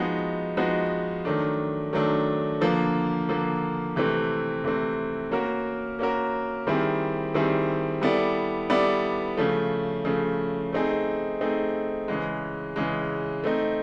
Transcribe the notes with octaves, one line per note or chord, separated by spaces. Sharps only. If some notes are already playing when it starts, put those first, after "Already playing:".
Already playing: F3 G#3 B3 D#4 F#4
F3 G#3 B3 D#4 F#4
D#3 F#3 A3 D4
D#3 F#3 A3 D4
D3 F3 A#3
D3 F3 A#3
C3 E3 A3 C4
C3 E3 A3 C4
A#3 C#4 F#4 A#4
A#3 C#4 F#4 A#4
D#3 G3 C4 E4 G#4
D#3 G3 C4 E4 G#4
G3 B3 E4 A4 D5
G3 B3 E4 A4 D5
C#3 F3 A3
C#3 F3 A3
A3 C4 D#4 G#4
A3 C4 D#4 G#4
C#3 E3 G#3
C#3 E3 G#3
A3 C4 D#4